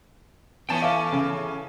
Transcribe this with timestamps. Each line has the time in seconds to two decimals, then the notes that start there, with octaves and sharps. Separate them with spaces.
0.69 A2 E3 B3 C#4 G5 A5
0.82 E5 F5 D6
1.12 C#3